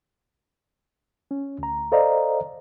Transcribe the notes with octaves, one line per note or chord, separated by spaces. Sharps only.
C#4
D2 A#5
A4 C5 D5 D#5 F5 A#5